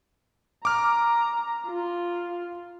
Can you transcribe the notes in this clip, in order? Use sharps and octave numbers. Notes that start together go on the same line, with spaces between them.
A#5 D6 F6
F4